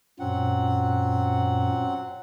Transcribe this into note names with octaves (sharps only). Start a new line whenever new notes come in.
F#2 A#2 F#3 C4 F#5